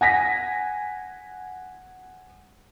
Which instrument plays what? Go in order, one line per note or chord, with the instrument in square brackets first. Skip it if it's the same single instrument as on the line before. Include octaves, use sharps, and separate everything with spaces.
[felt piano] F#5 G#5 A#6 B6